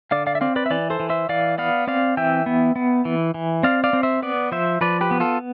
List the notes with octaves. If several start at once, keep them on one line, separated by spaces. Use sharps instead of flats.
D3 D5 F5
D5 F5
E5
C4 D5 F5
B4 D5
E5
E3 B4 D5
A4 C5
E3
C5 E5
E3 D5 F5
B3 D5 F5
C4 D5 F5
E3 E5 G5
B3
B3
E3
E3
C4 D5 F5
D5 F5
C4
C5 E5
B3 B4 D5
F3 C5 E5
F3 B4 D5
G4 B4
B3
F4 A4